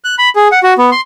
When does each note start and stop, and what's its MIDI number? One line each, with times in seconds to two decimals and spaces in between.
0.04 0.15 90
0.18 0.29 83
0.36 0.48 68
0.52 0.59 78
0.63 0.74 66
0.78 0.90 59
0.91 1.01 84